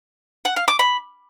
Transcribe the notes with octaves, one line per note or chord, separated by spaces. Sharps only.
F#5
F5
D6
B5